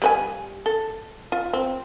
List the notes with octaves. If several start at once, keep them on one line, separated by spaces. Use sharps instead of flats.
G3 B4 G#5
A4
F4
C4